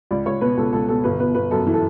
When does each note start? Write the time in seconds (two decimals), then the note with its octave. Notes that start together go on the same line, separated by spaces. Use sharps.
0.11 C#2 D5
0.26 C#2 C#5
0.41 B2 B4
0.57 C#2 A4
0.73 C#2 A4
0.88 B2 A4
1.04 G1 B4
1.20 G1 B4
1.35 G1 B4
1.51 F#2 A4
1.67 E3
1.74 A4